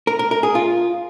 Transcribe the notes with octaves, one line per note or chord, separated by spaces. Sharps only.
A#4
A#4
A#4
G#4
F4